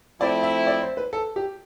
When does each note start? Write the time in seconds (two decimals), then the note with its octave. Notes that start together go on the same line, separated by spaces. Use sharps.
0.21 F3 A3 C4 E4 D5
0.43 E5
0.67 D5
0.81 C5
0.97 B4
1.13 A4
1.36 G4